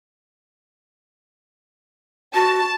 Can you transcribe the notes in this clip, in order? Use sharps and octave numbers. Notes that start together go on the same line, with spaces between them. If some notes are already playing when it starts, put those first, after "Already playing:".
F#4 A5